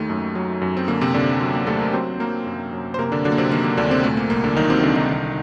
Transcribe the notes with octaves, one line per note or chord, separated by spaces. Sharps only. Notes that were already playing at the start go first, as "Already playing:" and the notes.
Already playing: D#2 D#3 A3
F#2
F#3
F#2
C4
D3 A#3
C3 C4
D#2 D3 D4
F#3
A#3
D#2 A3 A4
A#3 A#4
F#3 C4 C5
F#3 A#3 A#4
F#2
F#2
C5
C3 A#3 A#4
D3 D4
D3 F#3 D4
A#3
C3 C4
D#3 A#3
A#3
D2 D3 D4
C3 C4
A#2 A3
A#3
C2 A#3
D3 D4
D#3 F#3 D#4
C3 C4
C2 D3 D4
D#3 D#4
D3